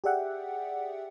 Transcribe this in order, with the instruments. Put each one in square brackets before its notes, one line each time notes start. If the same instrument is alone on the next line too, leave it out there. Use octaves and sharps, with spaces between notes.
[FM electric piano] G4 G#4 D5 E5 F#5 G5